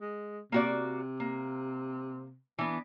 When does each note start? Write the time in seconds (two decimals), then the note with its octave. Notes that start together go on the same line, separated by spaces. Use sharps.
0.01 G#3
0.52 C3 A#3 F#4 D5
1.20 A#3
2.58 E3 B3 D4